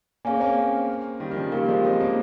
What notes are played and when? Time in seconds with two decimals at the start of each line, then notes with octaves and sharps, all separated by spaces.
0.25 A#3 C#4 G#4 C#5 F5 G#5
0.35 C4
0.41 A#3 C#4
1.20 D#3 G3
1.31 D#3
1.36 C#3 F3
1.52 G3 A#3 G4 A#4 F5
1.68 F3 G#3
1.84 C4 D#4
2.00 A#3 C#4